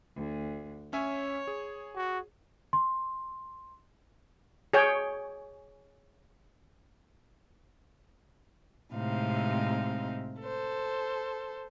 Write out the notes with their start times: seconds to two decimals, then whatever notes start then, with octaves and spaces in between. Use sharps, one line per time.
0.16 D2
0.93 C#4 C#5 E5 G#5
1.47 G#4
1.96 F#4
2.73 C6
4.73 G#4 C#5 G5
8.94 A2 C3 G#3 C4 D#4 F5
10.43 A4 C5